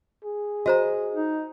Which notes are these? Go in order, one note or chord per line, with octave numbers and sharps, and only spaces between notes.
G#4
F#4 C5 D#5 A#5
D#4